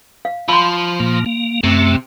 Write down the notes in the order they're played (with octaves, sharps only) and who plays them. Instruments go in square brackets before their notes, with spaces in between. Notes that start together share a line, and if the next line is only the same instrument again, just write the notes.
[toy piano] F5
[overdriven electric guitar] F3 [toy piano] B5 C6
[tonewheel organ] A#2 A#3
A#3
[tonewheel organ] F#2 A3 [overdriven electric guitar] C3